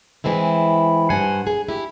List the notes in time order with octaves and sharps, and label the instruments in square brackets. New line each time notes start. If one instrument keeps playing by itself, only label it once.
[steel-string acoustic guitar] E3 G#3 C4 E4
G2 C5 F#5 G#5
G#4
E4 G4